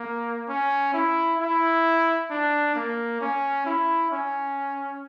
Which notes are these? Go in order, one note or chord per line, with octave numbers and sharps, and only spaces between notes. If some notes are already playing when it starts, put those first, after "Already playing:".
Already playing: A#3
C#4
E4
E4
D4
A#3
C#4
E4
C#4